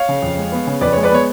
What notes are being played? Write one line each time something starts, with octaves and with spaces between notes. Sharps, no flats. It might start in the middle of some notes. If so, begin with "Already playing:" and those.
Already playing: C#5 F5
C#3
F2
G#3
B3
C#3
F2 B4 D5
G#3 C#5
B4 D5
B3 C#5